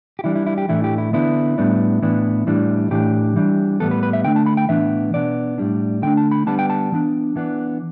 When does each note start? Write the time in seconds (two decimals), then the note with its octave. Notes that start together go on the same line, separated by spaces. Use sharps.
0.19 G4
0.24 E3 G3 D4 E4
0.35 E4
0.47 E4
0.58 G4
0.69 A2 E3 A3 D4 E4
0.84 G4
0.98 E4
1.13 D3 B3 D4 E4
1.58 A2 G3 B3 D4
2.02 A2 E3 B3 D4
2.47 A2 E3 G3 D4
2.91 A2 E3 A3 D4 G4
3.36 E3 G3 D4
3.80 A2 G3 B3 A4
3.91 B4
4.03 B4
4.13 E5
4.24 D3 A3 D4 G5
4.36 A5
4.46 B5
4.57 G5
4.69 A2 E3 B3 D4 E5
5.13 B2 B3 D4 D5
5.58 A2 G3 D4
6.02 D3 A3 D4 G5
6.17 A5
6.31 B5
6.47 D3 G3 B3 D4 A5
6.59 G5
6.70 A5
6.92 E3 B3 D4
7.36 E3 B3 D4